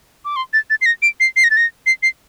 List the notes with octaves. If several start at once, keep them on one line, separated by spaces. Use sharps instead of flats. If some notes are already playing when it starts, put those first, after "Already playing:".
D6
C6
A6
A6
C7
A#6
D7
C7
C7
A#6
A6
A#6
C7
C7